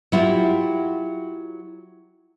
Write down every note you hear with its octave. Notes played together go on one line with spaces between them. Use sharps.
F#3 E4 F4 G4